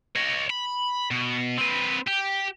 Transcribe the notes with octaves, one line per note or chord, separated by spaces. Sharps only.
C#5 D#5
B5
B2
C4 B4
G4